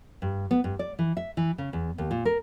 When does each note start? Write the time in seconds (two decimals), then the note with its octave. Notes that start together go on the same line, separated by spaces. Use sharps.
0.22 G2
0.51 B3
0.64 G2
0.79 D5
0.99 E3
1.17 E5
1.37 E3
1.58 C#3
1.73 E2
1.98 D#2
2.11 A#2
2.25 A#4